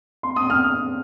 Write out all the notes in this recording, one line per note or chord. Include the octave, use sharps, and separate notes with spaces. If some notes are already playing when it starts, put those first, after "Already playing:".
C6
D#6
F6
D#6